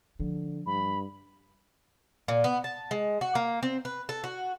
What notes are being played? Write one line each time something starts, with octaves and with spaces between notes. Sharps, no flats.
D3 F3
G2 B5
A#2
B3
A5
G#3
F#4
A#3
C4
B4
A4
F#4